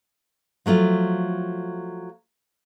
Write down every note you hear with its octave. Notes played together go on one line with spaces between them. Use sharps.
F3 F#3 A3 F4